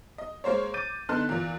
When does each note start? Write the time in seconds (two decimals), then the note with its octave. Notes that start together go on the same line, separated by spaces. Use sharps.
0.18 D#5
0.44 G#3 A#3 C5 C#5
0.74 D6 G6 A6 D#7
1.09 D3 B3 D#4 A5 C6 F#6
1.29 E2 A#2